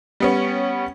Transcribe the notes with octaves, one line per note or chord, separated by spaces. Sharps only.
G3 B3 C#4